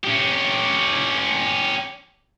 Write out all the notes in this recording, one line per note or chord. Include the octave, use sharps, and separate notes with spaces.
C#4 G4